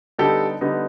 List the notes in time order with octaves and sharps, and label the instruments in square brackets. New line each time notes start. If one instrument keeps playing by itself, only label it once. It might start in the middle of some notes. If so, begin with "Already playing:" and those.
[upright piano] D3 G3 B3 D#4 G4 A4
D3 G3 B3 D#4